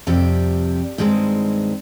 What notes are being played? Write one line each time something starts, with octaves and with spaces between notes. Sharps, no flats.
F2 C3 G3 G4
G2 D#3 G#3 C4